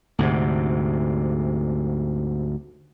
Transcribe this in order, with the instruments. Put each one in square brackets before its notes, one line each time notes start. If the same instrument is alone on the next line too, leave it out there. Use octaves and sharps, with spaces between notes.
[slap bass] D2 G#2 C3